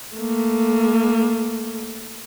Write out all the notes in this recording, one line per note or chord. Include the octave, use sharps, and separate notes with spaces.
A3 A#3